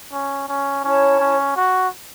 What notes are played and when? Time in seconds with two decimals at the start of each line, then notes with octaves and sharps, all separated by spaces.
0.13 C#4
0.49 C#4
0.84 C#4 E4 C#5 A5
1.20 C#4
1.56 F#4